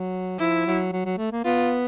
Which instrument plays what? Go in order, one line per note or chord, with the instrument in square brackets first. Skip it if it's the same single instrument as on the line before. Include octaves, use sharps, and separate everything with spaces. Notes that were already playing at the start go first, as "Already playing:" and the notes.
Already playing: [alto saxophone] F#3
[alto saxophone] F3 [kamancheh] E4
[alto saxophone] F#3
F#3
F#3
A3
A#3
[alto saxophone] B3 [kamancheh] F4